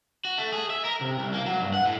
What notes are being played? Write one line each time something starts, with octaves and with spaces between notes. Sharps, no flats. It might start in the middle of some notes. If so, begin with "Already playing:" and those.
F#4
A3
G#4
E5
A#4
C3
C2
A#3
F#3
G2
F#5
A2